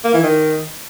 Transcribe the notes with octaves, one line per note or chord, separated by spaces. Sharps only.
A#3
E3
D#3